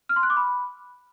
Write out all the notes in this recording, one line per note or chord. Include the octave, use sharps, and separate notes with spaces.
F6
C6
F#6
D6
B5